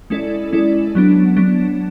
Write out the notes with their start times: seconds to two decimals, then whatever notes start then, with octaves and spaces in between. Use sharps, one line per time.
0.10 G#3 C#4 E4 A4 D5
0.52 G#3 C#4 E4 A4 D5
0.95 F#3 B3 D4
1.37 F#3 B3 D4